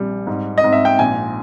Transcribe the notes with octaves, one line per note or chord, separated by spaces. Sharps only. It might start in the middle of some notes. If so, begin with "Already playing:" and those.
Already playing: A#1 G3
G#2
D#5
G#2
E5
G5
A#1 G#5